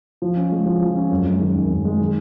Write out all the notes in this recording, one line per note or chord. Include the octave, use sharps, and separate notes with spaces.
F3
C#4
G#3
F3
F3
C#4
F#2
G#3
D#3
F#2
F#2
G#3
D#3